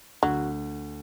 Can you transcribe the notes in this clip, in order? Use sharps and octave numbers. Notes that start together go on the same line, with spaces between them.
D2 F#3